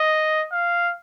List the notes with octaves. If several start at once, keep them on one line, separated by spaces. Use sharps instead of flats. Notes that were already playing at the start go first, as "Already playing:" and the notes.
Already playing: D#5
F5